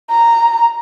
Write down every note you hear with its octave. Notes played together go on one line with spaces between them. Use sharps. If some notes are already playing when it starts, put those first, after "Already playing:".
A#5